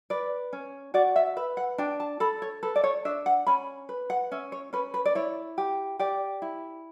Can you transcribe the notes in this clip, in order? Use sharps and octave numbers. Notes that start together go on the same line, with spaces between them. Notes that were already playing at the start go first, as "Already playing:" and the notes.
B4 D5
C#4
F#4 D5
E5
B4 E5
F#5
D4 G5
A5
A4 B5
C#5
A4 B4
D5
C#5
D4 E5
F#5
C#4 B5
B4
F#5
C#4 E5
C#5
C#4 B4
B4
D5
E4 C#5
G4
G4 D5
E4